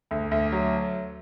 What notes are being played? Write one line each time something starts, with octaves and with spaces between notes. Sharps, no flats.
D2
D2
F#3